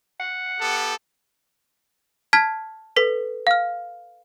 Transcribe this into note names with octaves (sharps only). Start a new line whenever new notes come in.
F#5
B3 G4 A4
A5 F6 G#6 B6
A4 B4 B6
F5 F6